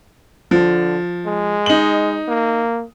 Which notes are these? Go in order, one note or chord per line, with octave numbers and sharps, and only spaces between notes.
D3 F3
G#3
D#4 F#7
A#3